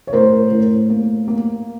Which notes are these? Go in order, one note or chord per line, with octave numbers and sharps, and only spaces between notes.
C#5
A2 A#4 C5
A2
A#3
A#3